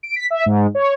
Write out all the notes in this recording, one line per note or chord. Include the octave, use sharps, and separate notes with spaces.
D7
B6
E5
G#2
C#5